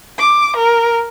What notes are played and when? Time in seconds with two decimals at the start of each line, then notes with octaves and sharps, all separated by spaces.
0.19 D6
0.57 A#4